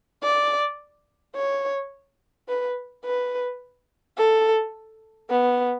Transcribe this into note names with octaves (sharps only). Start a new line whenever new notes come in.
D5
C#5
B4
B4
A4
B3